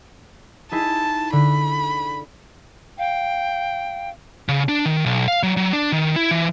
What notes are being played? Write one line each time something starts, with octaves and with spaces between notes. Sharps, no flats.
D#4 E4 G#4 A5
D3 B5
F5 G5
C#3
D4
D#3
B1
F5
F#3
F#3
D4
D#3
E4
E3